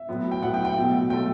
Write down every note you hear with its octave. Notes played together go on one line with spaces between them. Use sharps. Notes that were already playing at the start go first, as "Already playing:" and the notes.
Already playing: E5
A2 F#3 B3
G5
A2 F#3 B3 F#5
G5
G5
B2 F#3 A3
B2 F#3 A3 G5